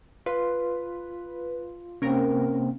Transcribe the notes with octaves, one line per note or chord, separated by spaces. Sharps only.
F4 B4
C3 A#3 C4 C#4 A#4